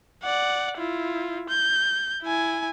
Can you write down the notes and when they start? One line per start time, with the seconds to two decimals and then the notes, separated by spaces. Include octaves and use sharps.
0.23 D5 F#5
0.78 E4 F4
1.49 G6
2.23 E4 G#5